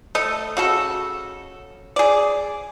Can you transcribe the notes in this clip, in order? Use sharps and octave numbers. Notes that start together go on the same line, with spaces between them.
A3 A4 D#5
C#3 F#4 A4
G#4 D5